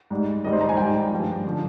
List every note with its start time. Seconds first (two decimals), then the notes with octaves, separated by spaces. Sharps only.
0.11 G#2 G3
0.44 G#2 D#3 G3 D#5
0.53 C5
0.61 A#5
0.69 G#5
0.77 G#2 D#3 G3 G5
1.11 G2 F3
1.46 D3 F3